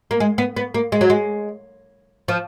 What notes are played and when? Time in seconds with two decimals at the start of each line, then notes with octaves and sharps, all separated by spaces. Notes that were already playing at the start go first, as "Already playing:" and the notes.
0.11 A#3
0.20 G#3
0.38 B3
0.56 B3
0.74 A#3
0.92 G#3
1.01 F#3
1.10 G#3
2.28 F3